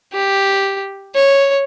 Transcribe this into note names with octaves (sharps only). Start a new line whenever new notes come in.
G4
C#5